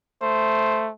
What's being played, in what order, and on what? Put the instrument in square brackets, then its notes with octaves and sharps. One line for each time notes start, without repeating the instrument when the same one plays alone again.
[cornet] A3 [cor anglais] C5